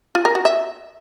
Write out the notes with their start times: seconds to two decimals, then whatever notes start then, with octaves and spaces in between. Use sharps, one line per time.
0.15 F4
0.25 A#4
0.35 F#4
0.45 E5